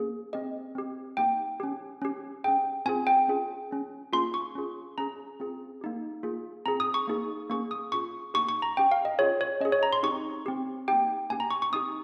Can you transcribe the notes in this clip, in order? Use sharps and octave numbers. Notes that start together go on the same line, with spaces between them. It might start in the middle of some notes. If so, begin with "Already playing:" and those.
Already playing: A#3 C#4 G#4
C4 G4 D#5
C4 G4
A#3 D#4 G4 G5
C#4 G4
C#4 G4
C#4 G#4 G5
C4 F4 G#4 G#5
G5
C#4 F4 G#4
C#4 G#4
A#3 C#4 F4 G#4 C6
C#6
C#4 F4 G#4
C#4 G#4 A#5
C4 F4 G#4
A#3 D#4 G4
A#3 F4 G#4
C4 F4 G#4 A#5
D#6
C#6
A#3 D#4 G#4
A#3 C#4 G#4 C#6
D#6
C#4 F4 G#4 C#6
A#3 D#4 G4 C#6
C#6
A#5
C#4 G4 G5
F5
D#5
C#4 F4 G#4 C#5
C#5
C#4 G#4 D#5
C#5
A#5
C6
C4 D#4 G4 C#6
C4 G4
A#3 D#4 G4 G5
A#3 C#4 G4 G#5
A#5
C#6
C#6
C4 D#4 G4 D#6